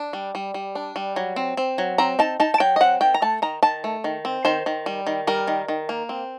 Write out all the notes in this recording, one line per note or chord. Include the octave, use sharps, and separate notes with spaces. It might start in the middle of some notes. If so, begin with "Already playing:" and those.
Already playing: D4
G3
G3
G3
D4
G3
F#3
C4
C4
F#3
C4 A#5
D#4 A5
D#4 A5
A5
F#3 G5
D#5
C4 F#5
D#3 G5
A#5
A3 A5
D#3 A#5
D#3 A5
A3
D#3
C4
D#3 C5
D#3
G3
D#3
G3 A#4
D#3
D#3
A#3
C4